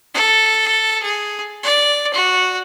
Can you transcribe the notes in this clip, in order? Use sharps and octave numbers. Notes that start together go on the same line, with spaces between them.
A4
G#4
D5
F#4